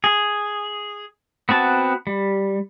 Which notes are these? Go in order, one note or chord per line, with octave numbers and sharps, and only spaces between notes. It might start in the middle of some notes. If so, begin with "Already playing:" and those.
G#4
B3 C4 F#4 A5
G3